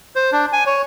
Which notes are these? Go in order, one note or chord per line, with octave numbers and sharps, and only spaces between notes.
C5
D4
G#5
C#5